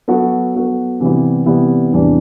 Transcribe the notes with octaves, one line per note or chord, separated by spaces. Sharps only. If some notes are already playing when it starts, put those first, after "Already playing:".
F#3 B3 F#4 A4
F#3 B3 F#4 A4
C3 E3 G3 B3 E4
C3 E3 G3 B3 E4
E2 C3 E3 G3 D4